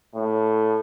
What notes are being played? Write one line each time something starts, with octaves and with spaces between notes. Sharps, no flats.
A2